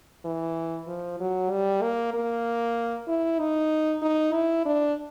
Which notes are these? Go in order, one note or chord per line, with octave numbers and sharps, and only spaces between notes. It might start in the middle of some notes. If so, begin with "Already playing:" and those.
E3
F3
F#3
G3
A#3
A#3
E4
D#4
D#4
E4
D4